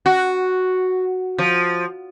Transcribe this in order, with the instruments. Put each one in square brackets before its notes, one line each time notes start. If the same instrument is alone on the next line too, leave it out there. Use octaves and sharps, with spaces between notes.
[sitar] F#4
F3